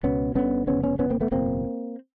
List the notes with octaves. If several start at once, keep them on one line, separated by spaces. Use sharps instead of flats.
C#2 B2 B3 C#4
G1 G2 D3 B3 C#4
F1 E2 C#3 B3 C#4
B3 C#4
G1 F2 C3 B3 C#4
A#3 C4
A3 B3
F#1 E2 B2 A#3 C4